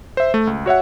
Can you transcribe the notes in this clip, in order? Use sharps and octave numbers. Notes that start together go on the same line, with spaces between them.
C5 E5
A3
C#2
F#4 C#5 E5 F#5